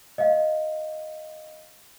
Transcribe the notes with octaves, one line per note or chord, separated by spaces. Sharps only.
D#5 F5